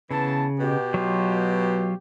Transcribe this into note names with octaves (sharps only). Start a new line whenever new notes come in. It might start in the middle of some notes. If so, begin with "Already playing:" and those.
C#3 E3 B3 A5
B2 G4
F#3 F4